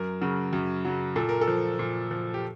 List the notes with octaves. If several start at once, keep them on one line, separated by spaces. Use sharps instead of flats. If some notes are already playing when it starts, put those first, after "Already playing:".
Already playing: F#2 A#4
C#3 F#3
F#2
C#3 F#3
A#2 A4
A#4
A4
F3
A#2
F3
G4